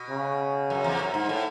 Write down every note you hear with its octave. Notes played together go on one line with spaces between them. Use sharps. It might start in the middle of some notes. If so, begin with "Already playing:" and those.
Already playing: B2
C#3
F#2
E2
F#2
G#2
A2